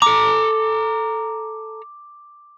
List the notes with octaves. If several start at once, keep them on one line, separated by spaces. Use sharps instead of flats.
A4 A#5 D6